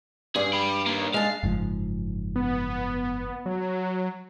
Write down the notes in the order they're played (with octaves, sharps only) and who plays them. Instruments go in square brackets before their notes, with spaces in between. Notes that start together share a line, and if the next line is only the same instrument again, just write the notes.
[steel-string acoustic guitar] G2 [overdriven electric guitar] G#4
[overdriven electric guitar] G5 B5
D#3 A#3
[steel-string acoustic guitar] G#3 A5 [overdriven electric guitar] F5
[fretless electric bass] F#1 G#2 F3
[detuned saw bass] B3
F#3